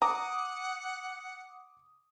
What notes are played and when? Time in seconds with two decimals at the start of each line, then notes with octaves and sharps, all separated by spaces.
0.02 F#5 A#5 D6 D#6